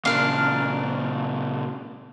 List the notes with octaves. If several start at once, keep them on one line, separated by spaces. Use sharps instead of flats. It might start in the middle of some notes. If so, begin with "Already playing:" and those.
A#2 C#3 D4 A#4 F5